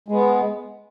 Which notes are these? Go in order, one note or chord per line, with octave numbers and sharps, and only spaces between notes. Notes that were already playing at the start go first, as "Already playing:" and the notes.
G#3 B3